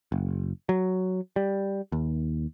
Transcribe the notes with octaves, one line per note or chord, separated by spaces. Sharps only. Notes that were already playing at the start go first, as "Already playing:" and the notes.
F#1
F#3
G3
D#2